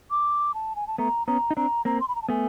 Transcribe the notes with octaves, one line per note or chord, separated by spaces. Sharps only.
D6
A5
G#5
A5
A3 B3 A#5
B3 C#4 A#5
D#4
C4 D4 A#5
A#3 C4 A#5
C6
B5
A#5
A5
A3 B3 G#5